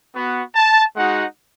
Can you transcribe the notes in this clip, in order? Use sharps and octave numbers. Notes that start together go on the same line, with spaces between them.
B3 F#4
A5
G#3 D#4 F#4 F#5